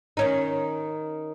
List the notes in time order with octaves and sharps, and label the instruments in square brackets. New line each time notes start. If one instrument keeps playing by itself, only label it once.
[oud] D#3 C#4 D#4